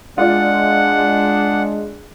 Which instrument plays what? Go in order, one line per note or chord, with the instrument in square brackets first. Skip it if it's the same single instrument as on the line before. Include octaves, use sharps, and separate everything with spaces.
[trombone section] G#3 [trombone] D4 [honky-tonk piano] F4 D5 [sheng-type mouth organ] F#5